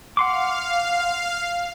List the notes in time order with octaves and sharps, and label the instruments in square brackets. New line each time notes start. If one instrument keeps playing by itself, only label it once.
[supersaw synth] F5 [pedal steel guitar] F#5 C6 D6